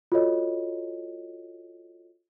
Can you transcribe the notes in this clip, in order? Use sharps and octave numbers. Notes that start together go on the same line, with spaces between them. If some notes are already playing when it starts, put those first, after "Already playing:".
F4 F#4 A4 C#5 D#5